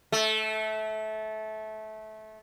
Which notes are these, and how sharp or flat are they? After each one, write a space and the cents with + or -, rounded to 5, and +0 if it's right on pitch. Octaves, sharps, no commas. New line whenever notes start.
A3 -20